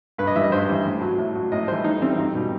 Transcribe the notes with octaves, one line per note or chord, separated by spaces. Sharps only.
G2 B4
D#5
E3 G3 E5
D#5
G2 C5
E3 G3
A2
F#3
A2
F#3
A2 D#5
E3 G3 C5
A2 D#4
E3 G3 C4
E2 D#4
B2 G3